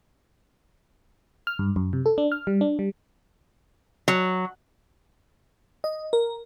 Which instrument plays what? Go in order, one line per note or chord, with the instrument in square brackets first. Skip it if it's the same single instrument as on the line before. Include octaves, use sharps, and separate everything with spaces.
[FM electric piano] F6
G2
F#2
C3
A4
D4
F6
G3
D4
G3
[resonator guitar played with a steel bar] F#3
[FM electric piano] D#5
A#4